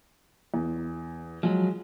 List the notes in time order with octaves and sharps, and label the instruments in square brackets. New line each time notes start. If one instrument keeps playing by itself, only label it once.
[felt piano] E2
[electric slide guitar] F3 F#3 [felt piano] G#3